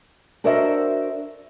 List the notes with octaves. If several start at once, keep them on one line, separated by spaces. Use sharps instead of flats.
D4 F#4 A#4 C5 D#5 E5